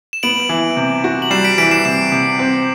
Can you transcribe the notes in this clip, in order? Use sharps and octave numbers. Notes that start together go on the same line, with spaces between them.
E7
B3 D7 F#7
E3
C3
F#4
F#7
G3 C7 E7
B6 D7
E3 B6 D7
C7 E7
C3 C7 E7
C3
C4